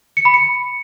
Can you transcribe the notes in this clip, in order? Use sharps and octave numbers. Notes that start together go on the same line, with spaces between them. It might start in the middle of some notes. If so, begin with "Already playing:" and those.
C#7
B5
C#7